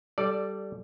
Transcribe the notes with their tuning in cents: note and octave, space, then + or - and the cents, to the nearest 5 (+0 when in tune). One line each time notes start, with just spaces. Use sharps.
G3 -10 A4 +0 D5 +0